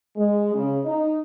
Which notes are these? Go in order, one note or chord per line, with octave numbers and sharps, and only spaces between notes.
G#3
C#3
D#4